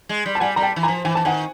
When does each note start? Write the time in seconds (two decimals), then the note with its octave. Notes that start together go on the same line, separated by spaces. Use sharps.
0.09 G#3
0.26 G3
0.35 A5
0.40 G3 F#5 G#5
0.56 G3 A#5
0.62 G5 A5
0.76 E3
0.83 G#5 A#5
0.88 F3
1.05 E3 G#5
1.15 E3 A5
1.25 D#3 F#5 G#5